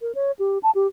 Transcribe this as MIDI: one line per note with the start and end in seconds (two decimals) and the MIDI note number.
0.01 0.12 70
0.15 0.31 73
0.39 0.58 67
0.63 0.71 81
0.75 0.87 67